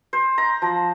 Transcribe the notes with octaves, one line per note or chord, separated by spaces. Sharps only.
C5
A#5
F3